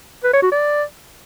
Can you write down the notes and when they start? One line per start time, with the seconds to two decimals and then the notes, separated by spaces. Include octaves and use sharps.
0.24 B4
0.33 C#5
0.42 F#4
0.52 D5